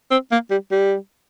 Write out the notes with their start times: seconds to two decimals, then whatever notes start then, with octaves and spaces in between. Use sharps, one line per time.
0.11 C4
0.32 A#3
0.51 G3
0.71 G3